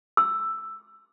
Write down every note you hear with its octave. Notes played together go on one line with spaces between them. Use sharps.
E6